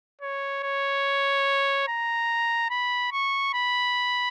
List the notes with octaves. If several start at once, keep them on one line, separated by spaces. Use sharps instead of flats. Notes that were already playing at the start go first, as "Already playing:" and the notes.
C#5
C#5
A#5
B5
C#6
B5